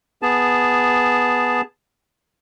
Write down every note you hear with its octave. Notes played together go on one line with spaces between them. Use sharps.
B3 G#4 A5